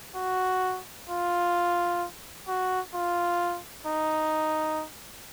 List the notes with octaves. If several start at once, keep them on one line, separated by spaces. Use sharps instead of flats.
F#4
F4
F#4
F4
D#4